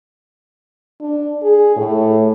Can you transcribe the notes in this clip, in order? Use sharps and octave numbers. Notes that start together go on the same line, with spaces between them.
D4
G#4
A2